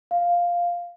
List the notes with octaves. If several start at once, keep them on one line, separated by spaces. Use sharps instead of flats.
F5